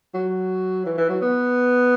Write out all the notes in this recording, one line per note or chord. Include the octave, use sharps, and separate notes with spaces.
F#3
E3
E3
F#3
B3